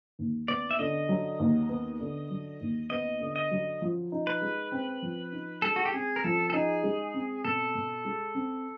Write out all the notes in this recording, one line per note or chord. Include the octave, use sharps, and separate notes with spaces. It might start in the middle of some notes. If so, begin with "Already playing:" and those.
D#2
B3 D5
E5
D3 D#5
F#3
D#2
B3
D3
F#3
D#2
B3 D#5
D3
D#5
F#3
F3
D#4
B4
G#3
C4
F3
D#4
G#3 A4
F#4
G4
C4 G#4
A#4
F3 A4
A4
D#4 G#4
G#3
C4
B2 A4
B2
G#3
C4